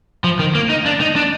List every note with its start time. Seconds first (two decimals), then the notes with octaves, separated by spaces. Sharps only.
0.24 F3
0.39 D#3
0.55 A#3
0.70 D#4
0.86 D4
1.00 D#4
1.16 D4